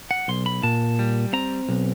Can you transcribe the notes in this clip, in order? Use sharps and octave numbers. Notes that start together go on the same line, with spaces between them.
F#5
B1 C6
B5
A#2 A5
G3
C4 A#5
B1